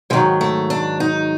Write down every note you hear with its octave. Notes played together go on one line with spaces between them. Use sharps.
G#2 D#3 F#3 G#3
A3
D4
D#4